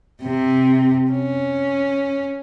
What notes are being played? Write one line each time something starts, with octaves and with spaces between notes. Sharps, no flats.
C3
C#4